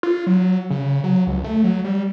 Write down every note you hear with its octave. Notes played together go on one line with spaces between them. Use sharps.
F4
F#3
C#3
F#3
C#2
A3
F#3
G3